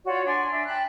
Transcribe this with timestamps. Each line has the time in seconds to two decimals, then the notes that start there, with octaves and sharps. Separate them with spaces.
0.04 F4 F#4 C#5 D5
0.25 D4 D5 G#5 C6
0.51 D4 E5
0.66 G5 A5 B5 F#6